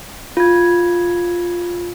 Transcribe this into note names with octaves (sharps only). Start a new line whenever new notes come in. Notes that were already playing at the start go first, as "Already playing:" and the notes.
F4 G#6